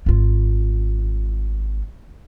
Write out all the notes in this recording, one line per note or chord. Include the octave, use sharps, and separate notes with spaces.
G#1 F4